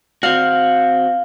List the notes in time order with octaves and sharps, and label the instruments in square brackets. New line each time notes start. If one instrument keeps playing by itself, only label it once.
[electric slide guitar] C4 F#4 [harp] F5